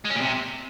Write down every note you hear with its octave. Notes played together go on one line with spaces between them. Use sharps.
G#3
C#4
A#2
C3